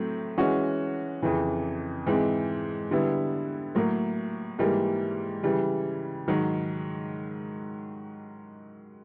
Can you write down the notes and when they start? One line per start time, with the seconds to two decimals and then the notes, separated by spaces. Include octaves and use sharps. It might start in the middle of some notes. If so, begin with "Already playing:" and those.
Already playing: A2 F#3 A3 C4
0.38 E3 G#3 C#4 F#4
1.22 F2 C#3 E3
2.07 G#2 E3 G#3 C4
2.91 D3 G3 B3 E4
3.75 A2 F#3 A#3
4.59 G#2 E3 G3 A#3
5.43 C#3 E3 G3
6.28 G#2 D#3 F#3